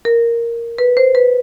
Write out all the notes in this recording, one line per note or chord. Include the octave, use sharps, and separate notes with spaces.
A#4
B4
C5
B4